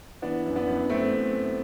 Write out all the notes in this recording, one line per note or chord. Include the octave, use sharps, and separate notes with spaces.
E3 B3 D4
F#2
B3 D4
F#2
F#2 A3 C4